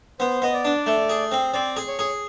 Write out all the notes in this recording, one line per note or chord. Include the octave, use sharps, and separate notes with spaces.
B3 C5
B3 D#5
D5
D4
A3
G#4
C4
C4 D5
G#4
C#5
G#4